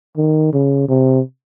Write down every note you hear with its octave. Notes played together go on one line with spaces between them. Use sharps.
D#3
C#3
C3